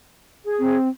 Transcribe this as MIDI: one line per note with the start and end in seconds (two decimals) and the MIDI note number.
0.44 0.77 68
0.60 0.88 60